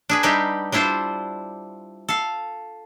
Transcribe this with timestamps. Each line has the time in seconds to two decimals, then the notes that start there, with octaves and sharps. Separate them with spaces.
0.09 D4 G#4 B4
0.23 G3 D4 D#4 G4 B4 E5
0.72 G3 D4 E4 F4 C5
2.09 A4 F5